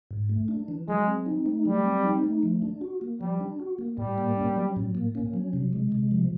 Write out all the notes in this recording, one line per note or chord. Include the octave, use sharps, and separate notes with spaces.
G#2
A3
D4
E3
F#3 G#3
C4
D#4
A3
F#3 G3
C4
D#4
A3
F3
D4
F#4
A#3
F3 G3
D4
F#4
A#3
A2 G3
A#3
C#4
F#3
A2
A#3
C#4
F#3
C3
G#3
C3
F3